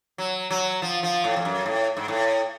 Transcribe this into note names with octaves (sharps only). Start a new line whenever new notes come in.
F#3
F#3
F3
F3
A2
F2
F#2
A2
G#2
A2